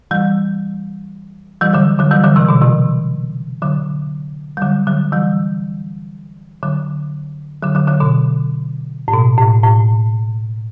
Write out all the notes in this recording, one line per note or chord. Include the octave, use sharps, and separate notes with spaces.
E3 G3
E3 G3
D3 F#3
D3 F#3
E3 G3
D3 F#3
C3 E3
B2 D3
C3 E3
D3 F#3
G3
D3 F#3
D3 F#3
E3 G3
D3 F#3
D3 F#3
D3 F#3
D3 F#3
B2 D3
A2
B2
A2
A2